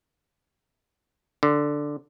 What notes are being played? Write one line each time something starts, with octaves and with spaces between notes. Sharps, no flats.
D3